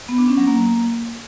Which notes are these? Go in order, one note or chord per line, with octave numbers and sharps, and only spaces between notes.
B3
D4
C#4
F#3
A#3